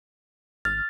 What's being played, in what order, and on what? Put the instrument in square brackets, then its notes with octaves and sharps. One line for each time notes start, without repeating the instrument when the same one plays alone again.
[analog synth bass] G#1 [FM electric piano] F6 [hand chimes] A6